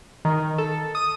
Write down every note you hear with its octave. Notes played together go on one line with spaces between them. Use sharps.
D#3
A4
D#6